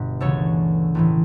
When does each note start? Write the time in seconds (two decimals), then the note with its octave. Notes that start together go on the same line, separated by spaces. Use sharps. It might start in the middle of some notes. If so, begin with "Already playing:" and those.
Already playing: G1 G2 B2
0.21 D2 C#3 E3 A4 C#5
0.95 A1 A2 E3